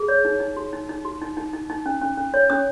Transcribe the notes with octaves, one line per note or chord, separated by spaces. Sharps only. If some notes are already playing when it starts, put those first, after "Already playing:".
Already playing: G#4
C#5
D#4
D#4
F#4
D#4
D#4
F#4
D#4
D#4
D#4
D#4
C#4
C#4
C#4
C#5
C#4 D#6